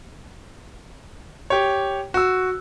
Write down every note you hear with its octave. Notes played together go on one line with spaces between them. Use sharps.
G4 C#5
F#4 E6